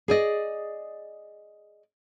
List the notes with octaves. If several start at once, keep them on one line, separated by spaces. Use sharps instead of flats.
G#4 D5 D#5